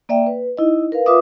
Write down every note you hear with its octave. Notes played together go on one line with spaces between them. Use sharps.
A#3 D5 E5 G5
B4
D#4 E4 D#5
A#4 B4 F5
F4 B4 E5 D6 D#6